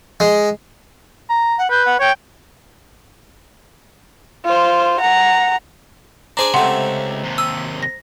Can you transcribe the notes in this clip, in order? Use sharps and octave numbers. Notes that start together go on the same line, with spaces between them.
G#3
A#5
F#5
B4 G6
F#5
C#5 G5
F4 C5
F#5 A#5
D4 G#4 C5 D5 A#5
C#2 C3 A3 F#5 C6
D#2 C3
D#6 E6
A#6